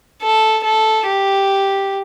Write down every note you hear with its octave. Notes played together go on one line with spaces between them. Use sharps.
A4
A4
G4